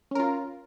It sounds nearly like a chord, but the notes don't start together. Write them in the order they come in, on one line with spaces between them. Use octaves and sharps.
C#4 A#4 F4